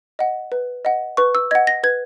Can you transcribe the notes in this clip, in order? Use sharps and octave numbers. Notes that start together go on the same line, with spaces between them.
D#5 F#5
B4
D#5 F#5
B4 C#6
E6
D#5 F#5 G#6
A#6
B4 G#6